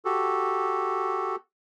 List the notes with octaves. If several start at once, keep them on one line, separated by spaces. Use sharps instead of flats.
F#4 G4 A4